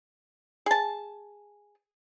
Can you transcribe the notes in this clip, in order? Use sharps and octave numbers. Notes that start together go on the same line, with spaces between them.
G#4 A5